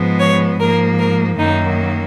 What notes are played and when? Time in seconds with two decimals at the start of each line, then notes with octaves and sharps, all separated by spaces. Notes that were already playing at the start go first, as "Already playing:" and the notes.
Already playing: G#2 F3 G#3 B3
0.20 C#5
0.60 G#2 F3 A#3 A#4
0.99 A#4
1.39 F#2 D#3 F#3 A#3 D#4